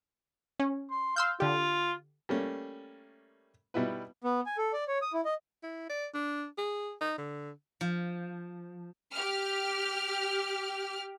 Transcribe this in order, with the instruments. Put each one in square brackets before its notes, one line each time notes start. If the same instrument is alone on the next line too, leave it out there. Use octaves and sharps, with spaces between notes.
[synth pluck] C#4
[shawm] C6
[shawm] F5 [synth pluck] C6 E6 G6
[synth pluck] D3 G4 [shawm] F4
[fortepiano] G3 A3 A#3 C#4
B2 G3 D#4 E4 B4
[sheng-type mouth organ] B3
G#5
A4
D5
C#5
D#6
E4
D#5
[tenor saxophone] E4
D5
D4
G#4
D#4
D3
[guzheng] F3
[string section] G4 F6